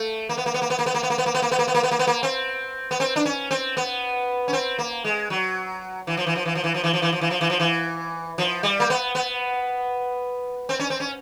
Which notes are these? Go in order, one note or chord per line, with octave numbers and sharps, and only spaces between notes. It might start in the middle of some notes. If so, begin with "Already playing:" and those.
Already playing: A3
A#3
B3
A#3
B3
A#3
B3
A#3
B3
A#3
B3
A#3
B3
A#3
B3
A#3
B3
A#3
B3
A#3
B3
A#3
B3
A#3
C4
B3
C4
D4
C#4
C4
B3
C#4
C4
A#3
G#3
F#3
E3
F3
E3
F3
E3
F3
E3
F3
E3
F3
E3
F3
E3
F3
E3
F3
E3
F3
G3
A#3
B3
B3
C4
C#4
C4
C#4